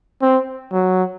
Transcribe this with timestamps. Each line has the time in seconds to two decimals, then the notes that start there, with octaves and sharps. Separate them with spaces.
0.22 C4
0.72 F#3